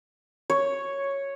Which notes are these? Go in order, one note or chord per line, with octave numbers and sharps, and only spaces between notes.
C#5